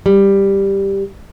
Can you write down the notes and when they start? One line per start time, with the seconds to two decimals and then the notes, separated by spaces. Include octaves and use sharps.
0.06 G3